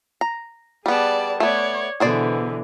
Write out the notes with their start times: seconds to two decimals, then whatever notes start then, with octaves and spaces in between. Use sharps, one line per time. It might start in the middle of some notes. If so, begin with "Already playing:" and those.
0.21 A#5
0.86 G3 B3 G#4 D5 A5
1.40 A3 B3 C#5 D5
2.00 B2 D3 E3 G#4 C5 D5